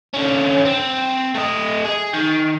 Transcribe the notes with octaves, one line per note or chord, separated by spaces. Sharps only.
D3 C#4
C4
A3 D#5
G#4
D#3